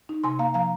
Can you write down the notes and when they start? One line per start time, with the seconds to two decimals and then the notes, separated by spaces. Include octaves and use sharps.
0.09 D#4
0.24 C3 G#5 C6
0.39 A#3 F5 A#5
0.54 F3 F5 A#5